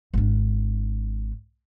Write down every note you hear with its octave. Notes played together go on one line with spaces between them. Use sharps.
G#1 D4